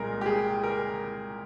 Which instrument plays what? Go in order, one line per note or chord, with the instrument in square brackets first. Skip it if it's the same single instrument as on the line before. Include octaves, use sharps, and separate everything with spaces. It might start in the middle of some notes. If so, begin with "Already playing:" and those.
Already playing: [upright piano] C2 A#2 G#3 A#4
G4
G#4
A#4